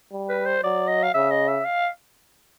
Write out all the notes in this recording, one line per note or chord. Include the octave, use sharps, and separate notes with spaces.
G3
B4
C5
F#3 D5
D#5
F5
C#3 E5
D#5
E5
F5